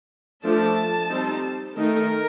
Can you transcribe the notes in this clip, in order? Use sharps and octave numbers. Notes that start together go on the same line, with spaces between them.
F3 A3 D4 A5
G3 C4 D#4
D#3 A3 D#4 A#4